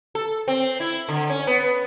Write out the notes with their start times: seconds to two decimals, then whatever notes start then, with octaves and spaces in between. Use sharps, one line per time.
0.15 A4
0.48 C4
0.80 E4
1.09 D3
1.30 C#4
1.47 B3